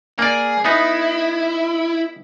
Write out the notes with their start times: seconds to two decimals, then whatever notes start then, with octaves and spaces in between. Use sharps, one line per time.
0.19 A#3 G#4 D5
0.65 B3 D#4 E4